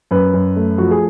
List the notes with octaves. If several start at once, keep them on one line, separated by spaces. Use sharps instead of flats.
F#2 B4
F#2
A3
F3 F#4
G#4